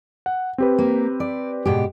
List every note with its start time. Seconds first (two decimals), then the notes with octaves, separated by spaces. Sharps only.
0.26 F#5
0.58 C4 G4 B4
0.78 A#3
1.20 D5
1.65 G#2 B2 G4